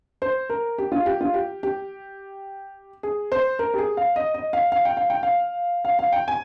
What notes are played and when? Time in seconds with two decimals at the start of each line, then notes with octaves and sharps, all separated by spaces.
0.22 C5
0.50 A#4
0.78 G4
0.92 F4
1.06 G4
1.21 F4
1.34 G4
1.63 G4
3.03 G#4
3.32 C5
3.59 A#4
3.74 G4
3.78 G#4
3.97 F5
4.16 D#5
4.34 D#5
4.53 F5
4.72 F5
4.85 G5
4.97 F5
5.10 G5
5.23 F5
5.85 F5
5.99 F5
6.12 G5
6.28 G#5